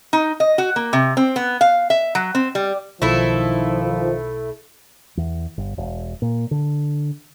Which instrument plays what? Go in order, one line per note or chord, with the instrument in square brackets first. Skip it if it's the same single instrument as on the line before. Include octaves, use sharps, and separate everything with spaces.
[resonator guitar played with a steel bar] D#4
D#5
F#4
A#3
C3
C4
B3
F5
E5
F#3
C4
G3
[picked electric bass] B1 [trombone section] D#3 F3 [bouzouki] A3 E4
[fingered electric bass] E2
G1
E1
A#2
D3